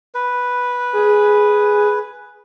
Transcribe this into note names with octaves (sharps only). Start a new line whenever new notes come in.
B4
G#4